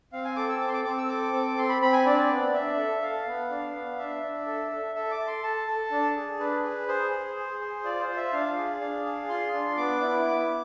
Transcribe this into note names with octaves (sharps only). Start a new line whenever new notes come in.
C4 F5
G#5
A4 D6
E6
C4 D6
C6
D6
C4 D6
E6
A4 D6
C4
C4 C6
B5
C4 B5
G#5
D4 D5
B3
D4 E5
A4
A4 F5
B3
D4
B3
D4 E5
D4
A4
A4
A4 E5
D6
A4
C6
A4 A5
A4
D4
G#4
D4 B4
G#4
G#4 C5
G#4
G#4
G#4
F4 D5
C5
F4
E5
D4 F5
G#4
D4
G#4
F4 C6
D4
B3 D6
E4
B3